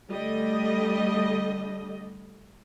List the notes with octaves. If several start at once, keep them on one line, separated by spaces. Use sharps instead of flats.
D3 G3 A3 D#5